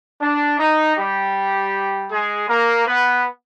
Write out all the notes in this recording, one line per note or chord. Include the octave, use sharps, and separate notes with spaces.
D4
D#4
G3 G4
G#3 G#4
A#3 A#4
B3 B4